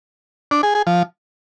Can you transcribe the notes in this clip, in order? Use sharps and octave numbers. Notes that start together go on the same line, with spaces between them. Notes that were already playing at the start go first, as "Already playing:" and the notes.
D4
G#4
G#4
F3